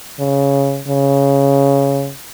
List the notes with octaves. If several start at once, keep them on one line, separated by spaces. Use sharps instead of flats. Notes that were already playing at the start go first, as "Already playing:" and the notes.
C#3
C#3